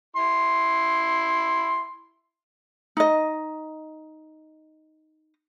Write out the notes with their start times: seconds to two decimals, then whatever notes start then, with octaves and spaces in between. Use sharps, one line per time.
0.16 E4 C6
2.97 D#4 D#5